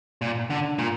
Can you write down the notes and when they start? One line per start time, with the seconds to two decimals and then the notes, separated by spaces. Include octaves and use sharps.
0.22 A#2
0.50 D3
0.78 A#2